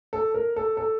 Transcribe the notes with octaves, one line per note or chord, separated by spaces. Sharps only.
A4
A#4
A4
A4